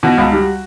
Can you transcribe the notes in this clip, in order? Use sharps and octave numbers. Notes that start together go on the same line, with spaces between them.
B2 F#4
C#2
G3